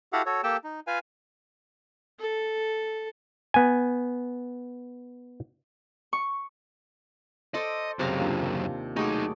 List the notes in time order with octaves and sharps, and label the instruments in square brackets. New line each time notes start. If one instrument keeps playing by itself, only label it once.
[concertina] E4 F#4 G4 A4 F5 F#5
F#4 A4 C#5
A#3 G4 A4 G5 A5
D#4
F4 B4 F5 G#5
[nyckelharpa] A4
[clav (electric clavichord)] B3 G#5
[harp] C#6
[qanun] A4 C5 D5 [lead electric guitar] D#5
[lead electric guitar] C#2 F#2 [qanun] C3 F5 A#5
[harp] D#2 D4 F4
[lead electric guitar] B1 D#4 [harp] F#3 A3 C#6 [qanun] G#3 G#4 D5